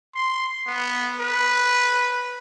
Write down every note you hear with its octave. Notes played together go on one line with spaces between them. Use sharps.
C6
B3
B4